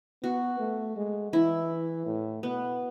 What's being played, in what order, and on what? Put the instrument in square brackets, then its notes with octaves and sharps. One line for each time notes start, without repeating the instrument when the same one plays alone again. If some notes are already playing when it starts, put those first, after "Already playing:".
[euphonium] B3 [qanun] F#4
[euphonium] A3
G#3
[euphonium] E3 [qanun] E4
[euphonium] A2
[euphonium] B2 [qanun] B3